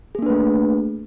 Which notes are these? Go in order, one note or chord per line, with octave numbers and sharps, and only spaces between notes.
A3 A#3 D4 G#4 B4